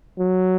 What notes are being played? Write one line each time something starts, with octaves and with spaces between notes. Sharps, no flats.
F#3